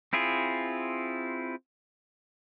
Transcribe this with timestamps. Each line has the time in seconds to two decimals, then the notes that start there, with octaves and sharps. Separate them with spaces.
0.13 C4 E4 F4 G#4